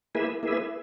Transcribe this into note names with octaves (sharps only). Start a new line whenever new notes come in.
A#3 E4 G#4 B4 E5
A#3 E4 G#4 B4 E5